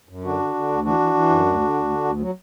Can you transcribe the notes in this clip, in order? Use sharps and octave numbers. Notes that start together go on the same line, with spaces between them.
F#2
D3 D4 F#4
D3
D3
D2
E3 D4 F#4
E3
E3
F#2
D2
D3
D2
D3
D2
F#3